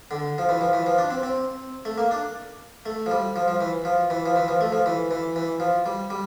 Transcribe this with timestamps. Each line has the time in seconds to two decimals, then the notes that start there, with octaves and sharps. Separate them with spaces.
0.11 D3
0.38 F3
0.49 E3
0.61 F3
0.73 E3
0.86 F3
0.98 D4
1.10 C4
1.23 C4
1.85 A3
1.98 A#3
2.11 D4
2.86 A3
3.06 F3
3.11 G3
3.36 F3
3.48 F3
3.61 E3
3.85 F3
4.10 E3
4.26 F3
4.36 E3
4.48 F3
4.61 A3
4.72 F3
4.86 E3
5.11 E3
5.36 E3
5.60 F3
5.86 G3
6.10 G3